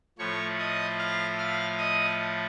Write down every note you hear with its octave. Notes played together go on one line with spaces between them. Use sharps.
A2 F3 A3 C#5 C#6
D#5 D#6
F5 F6
F5 F6
D#5 D#6